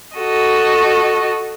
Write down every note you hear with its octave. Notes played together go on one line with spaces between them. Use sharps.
F#4 A4 D#5